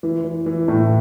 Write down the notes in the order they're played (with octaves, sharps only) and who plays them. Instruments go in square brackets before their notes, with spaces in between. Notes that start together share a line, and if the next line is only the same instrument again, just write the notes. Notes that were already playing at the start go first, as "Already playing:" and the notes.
[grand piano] E3
E3
E3
A2